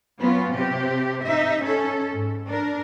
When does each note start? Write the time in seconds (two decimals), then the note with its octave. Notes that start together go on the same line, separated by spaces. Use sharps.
0.20 F#3 B3 C#4 F4
0.54 C3 C4 G4
1.24 D#4 E5
1.64 C#4 A4
2.11 G#2
2.48 D4 A#4